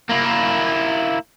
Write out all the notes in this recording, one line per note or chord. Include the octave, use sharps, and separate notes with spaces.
A#3 E4